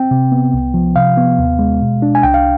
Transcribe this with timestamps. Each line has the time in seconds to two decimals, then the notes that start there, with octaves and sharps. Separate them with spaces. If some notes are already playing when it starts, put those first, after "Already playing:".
Already playing: C4 G5
0.11 C3
0.32 B3
0.54 C2
0.74 F3
0.96 C3 F5
1.17 B3
1.39 D#2
1.59 G#3
1.81 B2
2.02 D4
2.15 G#5
2.23 C2 G5
2.34 F5